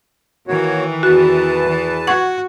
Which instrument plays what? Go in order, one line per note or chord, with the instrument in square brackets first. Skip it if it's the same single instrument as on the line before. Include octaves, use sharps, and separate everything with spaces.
[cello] D#3 E3 [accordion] A#3 F#4 C#5
[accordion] E2 B4 A5 [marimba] F#4
[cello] E3
[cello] F#4 [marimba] F#5 C#6 G#6